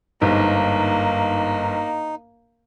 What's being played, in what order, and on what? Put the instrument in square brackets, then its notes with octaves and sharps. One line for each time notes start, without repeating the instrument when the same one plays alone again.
[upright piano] G1 G#2 [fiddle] A#3 [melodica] D#4